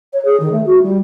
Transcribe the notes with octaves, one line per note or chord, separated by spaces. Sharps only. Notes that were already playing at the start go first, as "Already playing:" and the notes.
C#5
G#4
D#3
A3
F#4
G3